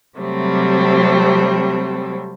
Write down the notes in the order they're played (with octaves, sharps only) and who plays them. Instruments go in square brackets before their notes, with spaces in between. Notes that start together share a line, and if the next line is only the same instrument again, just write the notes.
[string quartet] C3 F#3 G3 A3 C4